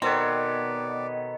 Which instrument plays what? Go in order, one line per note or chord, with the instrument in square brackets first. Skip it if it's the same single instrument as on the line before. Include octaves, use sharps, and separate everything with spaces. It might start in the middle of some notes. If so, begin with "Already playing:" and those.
[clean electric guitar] B2 B3 [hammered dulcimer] D#3 A4 C#5 [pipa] C4 [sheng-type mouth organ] D5